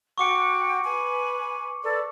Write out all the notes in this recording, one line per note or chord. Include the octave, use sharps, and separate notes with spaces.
F#4 F#5 G5 C#6 D6 C#7
B4 G#5
A4 B4 D5